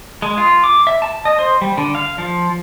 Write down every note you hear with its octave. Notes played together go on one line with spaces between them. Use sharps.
G#3
F4
D6
E5
A5
D#5
C5
G3
D3
F5
F3